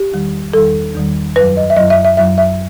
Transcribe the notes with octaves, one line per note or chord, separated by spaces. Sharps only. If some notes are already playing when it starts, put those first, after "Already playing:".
Already playing: G4
E2 D#3 G3
E2 D#3 G3 A4
E2 D#3 G3
F#2 F#3 B4
D#5
E5
F#2 F#3 D#5
E5
E5
F#2 F#3 E5
E5